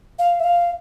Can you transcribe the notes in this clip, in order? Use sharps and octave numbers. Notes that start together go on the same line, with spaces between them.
F5
E5
F5